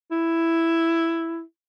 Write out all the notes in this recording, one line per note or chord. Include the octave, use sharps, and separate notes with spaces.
E4